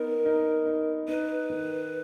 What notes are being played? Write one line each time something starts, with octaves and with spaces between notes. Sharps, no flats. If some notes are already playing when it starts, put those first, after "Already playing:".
Already playing: B3 D#4 A#4
D#4
D#4
D#4 B4
D#3